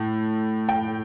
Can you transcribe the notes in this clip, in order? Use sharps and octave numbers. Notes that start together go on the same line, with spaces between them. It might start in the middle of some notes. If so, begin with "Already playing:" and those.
Already playing: A2
G5